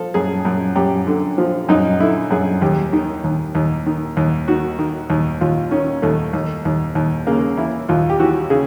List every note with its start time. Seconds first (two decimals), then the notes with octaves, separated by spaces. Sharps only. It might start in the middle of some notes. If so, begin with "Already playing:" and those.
Already playing: F3 A4
0.14 F#2 G#4
0.45 F#2
0.76 F#2 G4
1.07 D3
1.38 F3
1.69 F#2 D#4
2.00 D3 E4
2.30 F#2 G#4
2.62 D#2 G4
2.93 D#3
3.24 D#2
3.55 D#2
3.86 D#3
4.17 D#2
4.48 D#3 F#4
4.79 D#3
5.10 D#2
5.41 D#2 F4
5.71 D#3 C#4
6.02 D#2 A3
6.33 D#2
6.65 D#2
6.95 D#2
7.27 C#3 A#3
7.57 E3 E4
7.89 D#2 F4
8.10 G4
8.20 E3 F#4
8.50 C#3 G#4